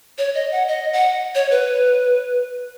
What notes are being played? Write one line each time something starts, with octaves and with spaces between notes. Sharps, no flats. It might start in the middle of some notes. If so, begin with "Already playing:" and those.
C#5
D#5
F#5
D#5
F#5
C#5
B4